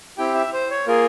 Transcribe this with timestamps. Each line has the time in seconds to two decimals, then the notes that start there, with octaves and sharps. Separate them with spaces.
0.18 C4 E4 G4 G5
0.35 E5
0.53 C5
0.70 C#5
0.87 A#3 F4 G#4 A#4